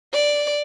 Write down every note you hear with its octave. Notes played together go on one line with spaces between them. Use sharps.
D5